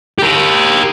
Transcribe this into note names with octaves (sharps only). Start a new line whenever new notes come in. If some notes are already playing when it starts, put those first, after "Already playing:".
G4 A#4